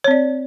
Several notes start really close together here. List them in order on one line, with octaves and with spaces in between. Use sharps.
C#5 C4 D5